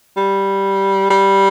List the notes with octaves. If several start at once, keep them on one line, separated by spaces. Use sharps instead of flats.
G3
G3